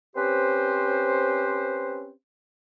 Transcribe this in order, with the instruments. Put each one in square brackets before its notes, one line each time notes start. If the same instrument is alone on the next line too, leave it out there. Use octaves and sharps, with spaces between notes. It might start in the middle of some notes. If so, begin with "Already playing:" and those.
[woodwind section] C4 C#4 G4 B4 C5